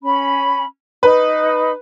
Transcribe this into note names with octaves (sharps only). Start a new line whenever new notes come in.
C#4 B5
D#4 B4